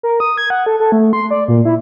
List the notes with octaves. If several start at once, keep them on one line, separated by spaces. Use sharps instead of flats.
A#4
D#6
G#6
F#5
A4
A4
A3
C6
D5
A#2
E4